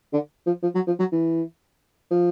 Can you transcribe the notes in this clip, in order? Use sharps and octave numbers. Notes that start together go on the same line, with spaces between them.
D3
F3
F3
F#3
F3
F#3
E3
F3